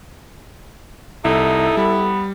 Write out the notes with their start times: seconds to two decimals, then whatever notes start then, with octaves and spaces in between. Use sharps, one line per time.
1.25 C2 D#4 E4 A4
1.77 G3 B3